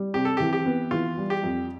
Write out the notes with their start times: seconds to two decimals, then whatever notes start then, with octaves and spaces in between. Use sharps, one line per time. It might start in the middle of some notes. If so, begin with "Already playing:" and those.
Already playing: G3
0.14 C3 G4
0.25 A4
0.37 E3 G4
0.53 G4
0.66 B3
0.91 E3 F4
1.17 G3
1.30 G4
1.43 F2